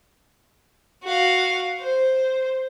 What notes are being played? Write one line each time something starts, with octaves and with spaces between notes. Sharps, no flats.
F#4 F5
C5